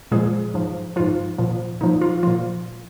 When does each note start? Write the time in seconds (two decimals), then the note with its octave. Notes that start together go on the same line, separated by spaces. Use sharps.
0.11 A#2 F3 G#3 G#4
0.54 G#2 F3
0.96 G#2 F3 F4
1.38 A#2 F3
1.81 A#2 F3 D#4
2.01 F4
2.23 A#2 F3 F4